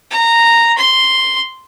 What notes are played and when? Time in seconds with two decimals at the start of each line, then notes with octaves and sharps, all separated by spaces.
0.11 A#5
0.77 C6